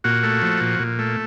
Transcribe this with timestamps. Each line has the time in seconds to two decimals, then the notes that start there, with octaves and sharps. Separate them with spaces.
0.04 A#2 F#4
0.23 A3
0.42 F3
0.61 A#2
0.79 A#2
0.99 A3